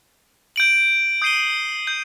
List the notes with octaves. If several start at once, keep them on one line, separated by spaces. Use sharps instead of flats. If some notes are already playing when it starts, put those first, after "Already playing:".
G6 D7 F#7
D#6 G6 C7 D#7 G7
G6